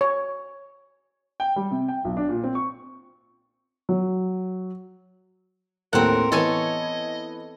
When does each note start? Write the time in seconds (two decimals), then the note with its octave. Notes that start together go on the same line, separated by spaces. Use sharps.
0.01 C#5
1.40 G5
1.56 G3
1.71 C3
1.88 G5
2.05 B1
2.17 D4
2.29 A#2
2.44 C4
2.55 C#6
3.89 F#3
5.93 D#2 A2 C4 A4 A#4 F#5
6.32 E3 B3 A4 C#5 D#5 G#5